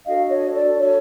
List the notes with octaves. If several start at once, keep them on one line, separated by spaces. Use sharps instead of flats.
D4 F#4 A4 D#5 F5
C#5 D#5
D5
C#5